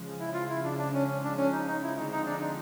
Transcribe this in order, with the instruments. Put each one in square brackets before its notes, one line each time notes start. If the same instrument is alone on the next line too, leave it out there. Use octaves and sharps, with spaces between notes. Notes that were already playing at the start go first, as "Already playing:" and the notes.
Already playing: [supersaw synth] C#3 F3 G#3
[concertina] E4
F4
E4
D4
D4
C#4
C#4
D4
C#4
D#4
D#4
E4
[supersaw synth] D3 F3 G#3 C4 [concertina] D#4
[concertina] D#4
D4
D#4